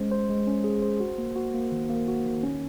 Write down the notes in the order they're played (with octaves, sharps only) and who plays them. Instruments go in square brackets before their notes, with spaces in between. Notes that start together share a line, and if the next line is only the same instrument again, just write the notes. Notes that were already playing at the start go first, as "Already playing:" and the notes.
Already playing: [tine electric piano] G#3 C#4 C5
C5
G#3
C#4
G#4
C5
F#4
A#3
F#4
A#3
D#3
A#3
F#4
D#3
C#4